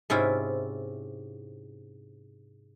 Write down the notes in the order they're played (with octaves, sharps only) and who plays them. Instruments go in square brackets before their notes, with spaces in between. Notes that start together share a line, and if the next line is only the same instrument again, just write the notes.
[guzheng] G#2 C3 C#4 E4 F4